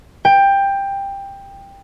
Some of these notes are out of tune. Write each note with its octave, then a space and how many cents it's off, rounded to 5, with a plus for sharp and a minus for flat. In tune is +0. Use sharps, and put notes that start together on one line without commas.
G5 +15